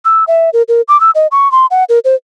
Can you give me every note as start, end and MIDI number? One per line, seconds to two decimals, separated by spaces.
0.05 0.24 88
0.27 0.50 76
0.53 0.62 70
0.68 0.81 70
0.88 1.00 86
1.00 1.11 88
1.15 1.27 75
1.32 1.50 85
1.52 1.66 84
1.71 1.84 78
1.89 1.99 70
2.05 2.15 72